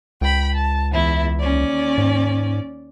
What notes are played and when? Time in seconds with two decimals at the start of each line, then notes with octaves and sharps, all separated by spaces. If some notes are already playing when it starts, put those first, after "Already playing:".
0.21 C#2 G5 B5
0.55 A5
0.91 E2 E4 E5
1.39 D#2 C#4 D5
1.98 G#2